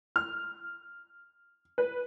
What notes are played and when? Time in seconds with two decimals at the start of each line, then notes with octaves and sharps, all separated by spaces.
0.16 F6
1.78 B4